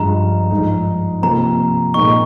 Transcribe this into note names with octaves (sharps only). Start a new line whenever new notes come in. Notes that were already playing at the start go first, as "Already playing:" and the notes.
Already playing: G2 F3 G#3 A#5
G#2 F3 G#3 D#4
C3 F3 A#3 A#5
A#2 G#3 C4 D#4 C#6